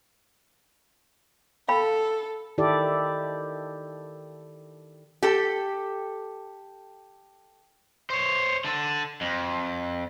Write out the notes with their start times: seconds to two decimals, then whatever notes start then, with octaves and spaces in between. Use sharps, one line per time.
1.69 A4 F5 G5 B5
2.58 D#3 E4 G4 A4 D5
5.23 G4 A4
8.10 C5 C#5
8.65 D3 A4
9.21 F2